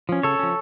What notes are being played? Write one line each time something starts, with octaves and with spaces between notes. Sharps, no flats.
F3 C#4
C#3 A4 C#5
F3 C#4